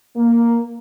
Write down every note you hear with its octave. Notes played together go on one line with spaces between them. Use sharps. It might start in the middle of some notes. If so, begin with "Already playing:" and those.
A#3